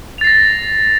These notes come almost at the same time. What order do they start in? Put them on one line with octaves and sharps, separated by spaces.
F7 A6 C7 A#6